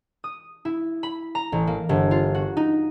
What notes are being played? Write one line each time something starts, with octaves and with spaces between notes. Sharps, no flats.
D#6
E4
B5
A#5
A1
A#3
G1
F4
F#4
D#4